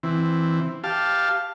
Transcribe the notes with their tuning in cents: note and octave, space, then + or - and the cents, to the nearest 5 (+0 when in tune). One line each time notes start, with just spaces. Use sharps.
E3 +0 C4 +0
G4 +0 F5 +0 A5 +0